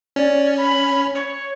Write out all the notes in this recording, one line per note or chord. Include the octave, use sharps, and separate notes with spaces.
C#4 D5
B5
C#5